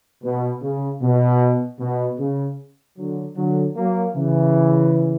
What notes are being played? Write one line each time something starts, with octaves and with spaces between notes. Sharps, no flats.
B2
C#3
B2
B2
C#3
D3 F#3
D3 F#3
F#3 A#3
C#3 E3